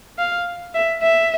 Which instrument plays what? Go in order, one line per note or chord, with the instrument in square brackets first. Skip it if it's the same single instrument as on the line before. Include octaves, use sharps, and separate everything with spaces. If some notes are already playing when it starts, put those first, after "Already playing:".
[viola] F5
E5
E5